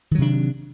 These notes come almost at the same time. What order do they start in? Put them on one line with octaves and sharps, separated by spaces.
D#3 F#3 C3 D4